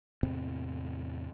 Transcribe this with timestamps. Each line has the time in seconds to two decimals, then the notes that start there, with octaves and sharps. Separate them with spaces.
0.23 E2 A2 C3 C4